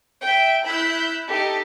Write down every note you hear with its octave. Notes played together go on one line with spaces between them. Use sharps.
E5 G5
E4 B5 E6 F#6 G6
D#4 G4 A4 D#5